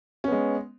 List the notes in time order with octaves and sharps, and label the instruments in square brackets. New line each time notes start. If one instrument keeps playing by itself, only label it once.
[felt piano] C#4
B3
G#3